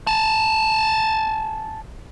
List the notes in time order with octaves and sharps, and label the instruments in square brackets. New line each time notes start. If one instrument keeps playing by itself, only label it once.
[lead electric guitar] G#5 A5